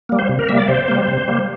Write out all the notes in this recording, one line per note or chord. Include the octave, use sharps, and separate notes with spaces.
G3 A#3
C5
C3
A#4
G3 A#3 E5
D5
C3 C5
G3 A#3
C3
G3 A#3